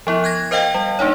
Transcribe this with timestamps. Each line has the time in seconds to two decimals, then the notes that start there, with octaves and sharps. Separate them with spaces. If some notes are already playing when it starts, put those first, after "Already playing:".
0.07 F3 B3 E4
0.24 F#6 G#6 A#6
0.51 A#4 C5 D#5 F5 G5
0.74 G3
0.99 A#3 D4 D#4 C#5